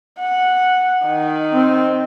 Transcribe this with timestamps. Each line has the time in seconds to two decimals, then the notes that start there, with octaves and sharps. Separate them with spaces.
0.20 F#5
1.05 D#3
1.54 C4